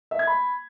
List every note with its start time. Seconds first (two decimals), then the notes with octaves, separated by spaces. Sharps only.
0.11 E5
0.19 G#6
0.27 B5